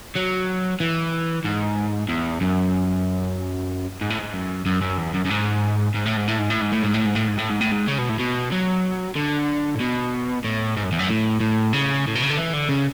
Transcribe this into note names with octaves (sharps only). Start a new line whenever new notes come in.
F#3
E3
G#2
E2
F#2
G#2
A2
G#2
F#2
F#2
F#2
E2
F#2
F#2
G#2
G#2
A2
G#2
A2
G#2
A2
G#2
A2
G#2
A2
G#2
A2
G#2
A2
G#2
A2
G#2
C#3
B2
A2
B2
F#3
D3
A2
B2
A2
G#2
F#2
E2
F#2
A2
A2
C#3
A2
B2
C#3
D3
E3
D3
C#3